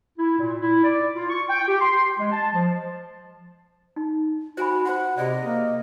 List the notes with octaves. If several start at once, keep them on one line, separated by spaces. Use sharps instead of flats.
E4
A#2
E4
D5
F4
C#6
G5
G4
C6
G#3
A5
F3
D#4
F#4 C5 G#5 B5
F#4 C5 F#5
C3 G#4 D5 D#5
A#3